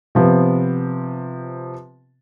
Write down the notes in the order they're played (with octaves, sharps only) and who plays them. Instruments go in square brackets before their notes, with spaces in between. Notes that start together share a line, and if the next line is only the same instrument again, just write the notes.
[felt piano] C3 F3 B3